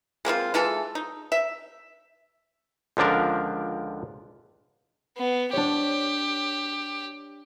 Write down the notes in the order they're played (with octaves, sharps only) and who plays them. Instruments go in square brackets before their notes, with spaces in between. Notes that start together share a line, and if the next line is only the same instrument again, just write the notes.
[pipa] G#3 A#3 C4 F4
E3 G#3 F4 A4
D#4
E5
[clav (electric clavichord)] C#2 D3 F3 D4 A#4
[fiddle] B3
[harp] D4 C#5 [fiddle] G4